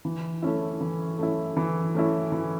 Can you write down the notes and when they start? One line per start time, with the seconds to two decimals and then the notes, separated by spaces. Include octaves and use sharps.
0.05 E3
0.42 A3 C#4 E4
0.81 E3
1.18 A3 C#4 E4
1.57 E3
1.94 A3 C#4 E4
2.32 E3